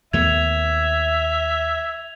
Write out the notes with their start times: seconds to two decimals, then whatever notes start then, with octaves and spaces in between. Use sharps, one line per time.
0.13 D#2 A3 B3 E5 G#6 F7